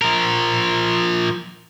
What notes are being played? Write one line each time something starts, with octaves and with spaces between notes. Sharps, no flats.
F3 A#4